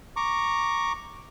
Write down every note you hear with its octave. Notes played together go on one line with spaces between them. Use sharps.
A#5 C#6 D6